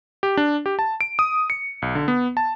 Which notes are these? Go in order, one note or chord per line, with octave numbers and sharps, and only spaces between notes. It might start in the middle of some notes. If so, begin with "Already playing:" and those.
G4
D4
G4
A5
D7
D#6
C#7
B1
D3
B3
A5